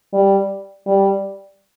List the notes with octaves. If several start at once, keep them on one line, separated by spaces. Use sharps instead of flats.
G3
G3